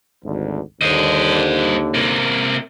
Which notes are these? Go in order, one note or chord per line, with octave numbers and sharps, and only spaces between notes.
G#1 D2
D#2 D3 C5 D#5
C3 A#3